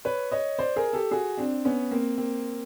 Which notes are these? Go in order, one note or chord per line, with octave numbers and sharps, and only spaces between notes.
B4 C#5
C#5 D#5
C5 D5
G#4 A#4
G4 A4
F#4 G#4
C4 D4
B3 C#4
A#3 C4
A#3 C4